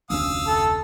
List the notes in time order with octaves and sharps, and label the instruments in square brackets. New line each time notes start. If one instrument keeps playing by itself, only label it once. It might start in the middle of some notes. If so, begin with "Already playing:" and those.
[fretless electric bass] F1 D2 C#4 [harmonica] F5 D#6 E6
[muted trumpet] A4